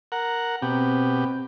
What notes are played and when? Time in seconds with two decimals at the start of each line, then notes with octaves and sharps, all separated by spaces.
0.12 A#4 F#5
0.62 B2 C4 G4